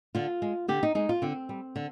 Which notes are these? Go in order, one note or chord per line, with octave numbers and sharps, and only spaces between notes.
D3 F4
G#3
D3 G4
D#4
G#3 D#4
F4
D3 C4
G3
D3